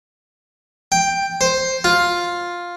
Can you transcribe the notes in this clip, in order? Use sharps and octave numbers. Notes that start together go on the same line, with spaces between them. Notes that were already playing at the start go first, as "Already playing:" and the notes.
G5
C5
F4